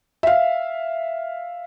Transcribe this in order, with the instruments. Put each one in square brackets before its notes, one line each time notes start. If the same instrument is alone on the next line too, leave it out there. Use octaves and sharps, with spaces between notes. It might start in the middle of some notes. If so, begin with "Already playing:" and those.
[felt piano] E5 F5